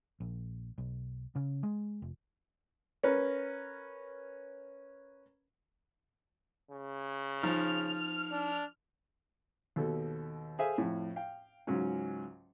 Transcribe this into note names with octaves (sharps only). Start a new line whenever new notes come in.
A#1
B1
C#3
G#3
F1
C#4 A#4 B4
C#3
F3 D#4 F6
D4
D#2 B2 A4
G#4 A4 C5 E5 F5 G#5
F2 A2
F5 G5
C#2 G#2 F#3 C#4